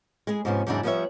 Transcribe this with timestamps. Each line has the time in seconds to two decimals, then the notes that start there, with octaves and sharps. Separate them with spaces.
0.27 G#3 E4 G#4
0.45 G#2 C3 F3 B3 C#4
0.67 E2 G#2 C#3 F#3 D4 E5
0.83 F3 G3 B3 A#4 C#5 E5